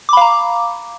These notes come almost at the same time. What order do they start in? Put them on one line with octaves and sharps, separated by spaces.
D6 B5 F5 A#5